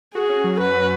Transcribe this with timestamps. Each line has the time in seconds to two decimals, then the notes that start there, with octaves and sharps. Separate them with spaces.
0.15 F#4 G#4
0.29 C#4
0.44 F#3
0.60 F#2 B4
0.76 F#4